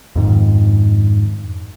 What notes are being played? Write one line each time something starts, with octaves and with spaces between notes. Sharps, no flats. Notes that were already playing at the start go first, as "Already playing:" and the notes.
F2 G#2 D#3